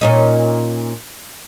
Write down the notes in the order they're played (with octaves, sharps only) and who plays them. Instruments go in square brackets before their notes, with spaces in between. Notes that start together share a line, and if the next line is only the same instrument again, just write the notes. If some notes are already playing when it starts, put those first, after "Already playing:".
[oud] A#2 C#4 D#4